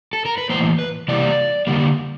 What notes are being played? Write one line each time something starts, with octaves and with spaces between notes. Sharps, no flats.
A4
A#4
B4
A2 E3 G3 A#3 C5
B4
C3 E3 G3 A#3 D5
D3 G3 A#3